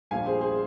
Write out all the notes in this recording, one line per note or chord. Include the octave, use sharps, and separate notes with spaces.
A#1 A#2 G3 F5 G#5
G#4 C5
G#4 C5